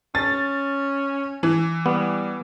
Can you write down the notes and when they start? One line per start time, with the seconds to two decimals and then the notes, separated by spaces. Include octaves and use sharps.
0.15 C#4 A6
1.43 E3
1.86 G3 B3